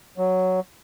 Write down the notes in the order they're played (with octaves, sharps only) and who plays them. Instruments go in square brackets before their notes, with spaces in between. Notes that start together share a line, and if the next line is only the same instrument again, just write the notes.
[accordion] F#3